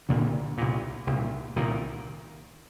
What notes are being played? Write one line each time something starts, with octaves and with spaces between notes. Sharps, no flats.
C2 A#2 D3
C2 A#2
C2 A#2
C2 A#2 D#3